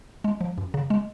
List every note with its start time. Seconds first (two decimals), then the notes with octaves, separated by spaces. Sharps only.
0.24 G#3
0.41 F3
0.58 F#2
0.74 C#3
0.90 G#3